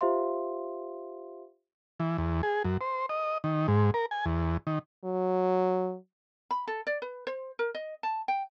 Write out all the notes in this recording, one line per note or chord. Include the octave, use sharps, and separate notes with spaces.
F4 G4 C5 E5 F5 C6
E3
E2
G#4
F#2
C5
D#5
D#3
G#2
A#4
G#5
E2
D#3
F#3
B5
A4
D5
B4
C5
A#4
D#5
A5
G5